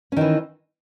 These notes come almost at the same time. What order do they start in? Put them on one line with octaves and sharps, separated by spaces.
C#4 D#3 E3